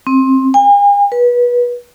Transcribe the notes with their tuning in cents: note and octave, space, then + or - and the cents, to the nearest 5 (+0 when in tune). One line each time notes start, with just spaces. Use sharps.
C4 +20
G#5 -45
B4 -25